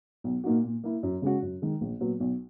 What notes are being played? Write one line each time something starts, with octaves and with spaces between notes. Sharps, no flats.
B1
A#2 A#3 D#4 F#4
A#2
A#3 E4
F#2
C#3 G#3 C#4 F#4
F#2
D#3 G#3
A#1
A#2 F#3 B3
B1